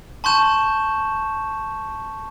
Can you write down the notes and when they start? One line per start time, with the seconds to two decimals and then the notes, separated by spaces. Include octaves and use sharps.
0.24 A5 C6 C#6 G6 E7